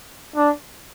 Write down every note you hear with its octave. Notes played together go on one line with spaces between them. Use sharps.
D4